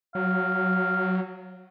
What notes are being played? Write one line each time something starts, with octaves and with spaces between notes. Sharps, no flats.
F#3 F5